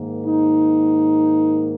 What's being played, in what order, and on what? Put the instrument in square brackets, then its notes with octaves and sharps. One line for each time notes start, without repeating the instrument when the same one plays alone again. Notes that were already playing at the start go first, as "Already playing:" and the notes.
Already playing: [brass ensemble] G#2 D#3 A#3
D#4